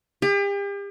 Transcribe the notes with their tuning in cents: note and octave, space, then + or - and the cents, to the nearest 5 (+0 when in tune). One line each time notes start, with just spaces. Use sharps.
G4 +40